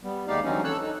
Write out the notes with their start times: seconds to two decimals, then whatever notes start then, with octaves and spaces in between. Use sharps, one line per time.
0.04 G3 B3
0.27 D#2 G#3 D#4 G4 D5 F5
0.44 D3 E3 F#3 C4 C#4 D#4
0.64 A4 C#5 E6 F#6
0.80 D#4